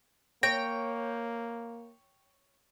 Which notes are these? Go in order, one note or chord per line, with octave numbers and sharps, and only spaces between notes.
A#3 C#5 G5 A#6